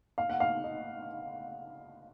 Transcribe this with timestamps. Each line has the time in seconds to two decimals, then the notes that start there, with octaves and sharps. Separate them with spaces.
0.18 F5
0.29 F#5
0.40 F5
0.64 D#5